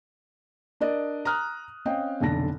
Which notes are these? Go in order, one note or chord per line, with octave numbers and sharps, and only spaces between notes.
D4 A#4 D5 D#5
A#5 D#6 F6 F#6
C4 C#4 D#5 F5 G5
F1 B1 D3 A5 A#6